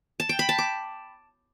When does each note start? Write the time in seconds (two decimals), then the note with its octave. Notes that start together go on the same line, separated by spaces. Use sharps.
0.20 A5
0.29 G5
0.39 B5
0.49 A5
0.58 D6